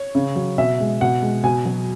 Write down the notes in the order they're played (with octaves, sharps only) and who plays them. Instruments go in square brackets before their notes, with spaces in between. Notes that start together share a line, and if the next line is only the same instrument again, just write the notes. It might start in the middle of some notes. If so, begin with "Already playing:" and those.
Already playing: [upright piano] C#5
C#3
F#3
B2 E5
G#3
B2 F#5
G#3
B2 G#5
F#3